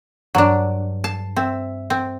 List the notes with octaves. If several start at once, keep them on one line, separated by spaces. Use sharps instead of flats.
G2 F#3 D4
A5 C7
C4 E5
C4